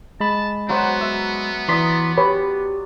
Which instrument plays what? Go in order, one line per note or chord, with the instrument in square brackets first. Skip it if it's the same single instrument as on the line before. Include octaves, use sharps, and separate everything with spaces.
[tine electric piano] G#3 B5 [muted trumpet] A5
[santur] F#3 F#4 C5 [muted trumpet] B3
[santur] E5
[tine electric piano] E3 C6 B6 [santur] D5 A#5 D#6
[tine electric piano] G4 [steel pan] B4 C#5 B5